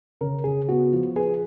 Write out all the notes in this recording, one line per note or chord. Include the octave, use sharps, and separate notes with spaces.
C#3 A#4
C#3 G#4
B3 F#4
F3
G#4 B4